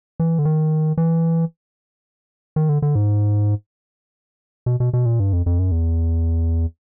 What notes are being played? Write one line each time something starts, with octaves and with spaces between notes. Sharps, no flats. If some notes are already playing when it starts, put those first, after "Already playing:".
E3
D3
D#3
E3
D#3
D3
D3
G#2
B2
B2
B2
A#2
G2
F2
F2
F#2
E2